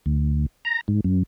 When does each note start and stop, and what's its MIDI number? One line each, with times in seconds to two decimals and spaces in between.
0.06 0.46 38
0.65 0.81 82
0.88 1.00 44
1.04 1.23 42